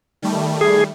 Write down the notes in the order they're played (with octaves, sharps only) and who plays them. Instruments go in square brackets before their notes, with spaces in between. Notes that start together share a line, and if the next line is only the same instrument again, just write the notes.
[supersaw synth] D#3 G3 A3
[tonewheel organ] G#4